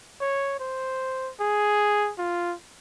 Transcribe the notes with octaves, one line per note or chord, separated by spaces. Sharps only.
C#5
C5
G#4
F4